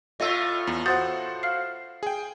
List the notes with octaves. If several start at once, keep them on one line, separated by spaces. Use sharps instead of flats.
A2 A3 F4 D#5 E6
E2
F#4 C5 F#5 D#6 G6 A6
F5 F6 C7
G#4 G5